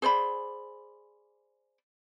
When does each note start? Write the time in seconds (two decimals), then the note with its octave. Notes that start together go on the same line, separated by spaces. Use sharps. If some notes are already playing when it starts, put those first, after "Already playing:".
0.02 G#4 C5 D5 B5